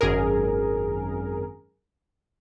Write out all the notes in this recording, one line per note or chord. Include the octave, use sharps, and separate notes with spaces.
G#1 F#2 G#4 A#4